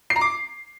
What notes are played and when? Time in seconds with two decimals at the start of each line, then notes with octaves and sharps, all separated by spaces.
0.10 C7
0.16 A#5
0.21 D6